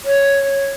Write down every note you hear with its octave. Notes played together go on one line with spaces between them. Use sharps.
C#5